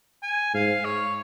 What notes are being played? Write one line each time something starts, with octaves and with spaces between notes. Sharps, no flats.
G#5
G#2 F5
C#5